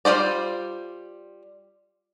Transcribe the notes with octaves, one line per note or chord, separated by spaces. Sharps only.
G3 F4 G#4 C5 D5